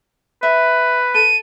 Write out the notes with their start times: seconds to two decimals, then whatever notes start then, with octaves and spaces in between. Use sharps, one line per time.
0.43 B4 E5
1.14 A4 D#7